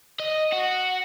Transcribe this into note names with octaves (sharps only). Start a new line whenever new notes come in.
D#5
F#4